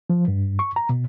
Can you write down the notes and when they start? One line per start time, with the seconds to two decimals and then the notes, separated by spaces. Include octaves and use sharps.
0.10 F3
0.28 G2
0.59 C#6
0.76 A#5
0.89 B2